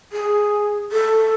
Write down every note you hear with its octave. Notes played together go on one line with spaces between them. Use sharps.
G#4
A4